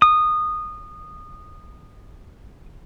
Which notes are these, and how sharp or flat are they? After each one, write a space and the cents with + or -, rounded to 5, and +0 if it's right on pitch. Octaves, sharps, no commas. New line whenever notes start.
D#6 -20